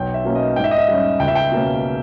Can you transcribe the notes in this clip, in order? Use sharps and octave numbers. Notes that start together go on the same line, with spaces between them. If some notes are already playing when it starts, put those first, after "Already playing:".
Already playing: B1 G5
E5
B2 A#3 C#4
D#5
G#2 G5
E5
D#5
E5
G3 C#4
C#2 G5
E5
G5
B2 A#3 C#4